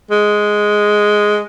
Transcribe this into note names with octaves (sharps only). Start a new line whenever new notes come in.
G#3